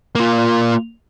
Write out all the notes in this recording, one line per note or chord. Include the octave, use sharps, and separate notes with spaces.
A#3 F4